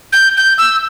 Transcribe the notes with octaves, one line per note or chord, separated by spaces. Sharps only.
G6
G6
E6